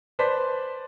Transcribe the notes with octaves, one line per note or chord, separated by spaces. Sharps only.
B4 C5 D5 A5 B6